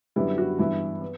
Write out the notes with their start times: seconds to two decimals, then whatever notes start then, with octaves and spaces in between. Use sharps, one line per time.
0.16 F#2 D3 G3 B3 E4
0.38 F#4
0.59 G2 E3 B3 E4
1.01 B3